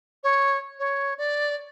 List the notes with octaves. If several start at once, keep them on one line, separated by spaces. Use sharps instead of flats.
C#5
C#5
D5